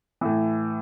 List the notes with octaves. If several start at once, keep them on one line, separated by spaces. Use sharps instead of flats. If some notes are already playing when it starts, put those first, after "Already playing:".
A2 E3